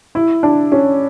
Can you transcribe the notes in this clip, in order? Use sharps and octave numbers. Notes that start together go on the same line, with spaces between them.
E4
D4
C#4